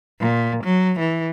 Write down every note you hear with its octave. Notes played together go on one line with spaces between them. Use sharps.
A#2
F#3
E3